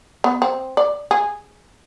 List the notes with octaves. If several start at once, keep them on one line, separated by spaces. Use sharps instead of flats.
B3
C4
D5
G#4